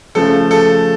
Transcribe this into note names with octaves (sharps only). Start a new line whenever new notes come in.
C#3 F3 A3 A4
A4